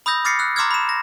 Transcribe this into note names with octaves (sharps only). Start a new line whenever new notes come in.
B5 D#6 E6 G6 A#6
D6 F6 A6 A#6 C7 C#7
E6 F#6
A#5 C6 D6 E6 F6 G#6
B5 E7
A#6